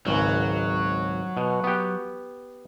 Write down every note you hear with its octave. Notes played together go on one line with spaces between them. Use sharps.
G#1 C#2 F#3
B2
B3 G4